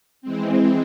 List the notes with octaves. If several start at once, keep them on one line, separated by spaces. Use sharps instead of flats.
E3 G#3 C4